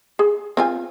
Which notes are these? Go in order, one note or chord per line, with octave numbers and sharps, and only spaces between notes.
G#4
C4 F4 G#5